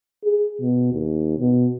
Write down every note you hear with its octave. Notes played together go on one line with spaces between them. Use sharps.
G#4
B2
D#2
B2